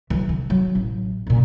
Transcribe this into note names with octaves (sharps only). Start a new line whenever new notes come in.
E3 F#3
D3
F#3
A1
F#2 A#2